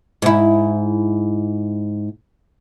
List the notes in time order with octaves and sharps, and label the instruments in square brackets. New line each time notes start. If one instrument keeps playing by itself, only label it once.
[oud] G#2 E4